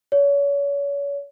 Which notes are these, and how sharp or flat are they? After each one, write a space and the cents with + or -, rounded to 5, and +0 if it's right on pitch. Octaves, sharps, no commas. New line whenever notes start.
C#5 +35